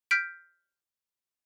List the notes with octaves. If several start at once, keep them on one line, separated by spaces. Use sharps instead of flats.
F6 G6 B6 D7